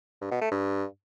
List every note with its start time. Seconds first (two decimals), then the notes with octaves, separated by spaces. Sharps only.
0.21 G2
0.31 B2
0.41 A3
0.52 G2